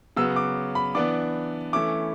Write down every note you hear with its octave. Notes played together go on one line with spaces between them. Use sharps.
C#3 F#3 B3 E6
D6
B5
E3 B3 D4 D6
E3 A3 C#4 E4 D6